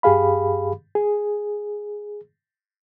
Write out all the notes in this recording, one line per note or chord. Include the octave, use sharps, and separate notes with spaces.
G2 G4 G#4 F5 B5
G#4